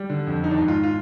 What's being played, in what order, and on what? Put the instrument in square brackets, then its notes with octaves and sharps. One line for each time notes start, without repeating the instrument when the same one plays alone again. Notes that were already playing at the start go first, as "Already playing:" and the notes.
Already playing: [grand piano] G3
D3
F2
D#3 D#4
D4
D#4
G#2
F4
F4